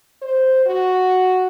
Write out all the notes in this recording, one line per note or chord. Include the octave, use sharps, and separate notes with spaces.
C5
F#4